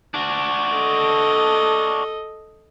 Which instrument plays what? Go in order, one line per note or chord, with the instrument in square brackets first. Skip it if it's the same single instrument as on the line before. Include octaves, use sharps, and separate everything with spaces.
[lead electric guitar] D4 F#4
[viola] A4 D#5